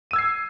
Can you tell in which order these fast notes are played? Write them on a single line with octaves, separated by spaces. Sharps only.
D#7 E6 G#6 C7